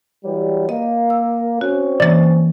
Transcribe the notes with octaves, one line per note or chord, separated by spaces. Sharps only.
E3 F#3 G3
A#3 D#5
E6
C4 C#4 F#4
E3 A#3 D5 A6